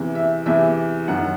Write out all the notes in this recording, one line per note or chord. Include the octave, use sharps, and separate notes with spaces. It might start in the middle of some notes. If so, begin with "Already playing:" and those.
Already playing: E2 C3 E3
E5
E2 C3 E3 E5
F#2 D#3 F#5